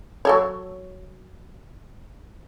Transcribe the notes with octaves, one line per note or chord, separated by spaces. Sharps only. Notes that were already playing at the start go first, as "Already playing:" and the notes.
F#3 A4 C#5